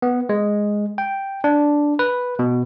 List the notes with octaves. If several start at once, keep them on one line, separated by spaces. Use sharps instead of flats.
B3
G#3
G5
D4
B4
B2